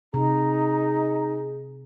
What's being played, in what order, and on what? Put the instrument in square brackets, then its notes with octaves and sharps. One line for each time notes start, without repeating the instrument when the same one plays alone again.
[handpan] C3 [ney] D#4 [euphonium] G#4 [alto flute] A#5